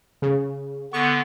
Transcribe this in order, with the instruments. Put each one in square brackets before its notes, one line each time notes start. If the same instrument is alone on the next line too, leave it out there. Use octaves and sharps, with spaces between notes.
[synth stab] C#3
[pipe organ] D3 B3 [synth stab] C#6